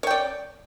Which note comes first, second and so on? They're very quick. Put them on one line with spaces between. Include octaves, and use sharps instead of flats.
C#5 G5 D5